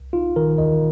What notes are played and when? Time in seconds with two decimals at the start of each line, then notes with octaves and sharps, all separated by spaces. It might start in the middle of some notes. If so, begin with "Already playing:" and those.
Already playing: C2
0.13 D#4 F4
0.36 D#3 A#4
0.58 D#2 D#5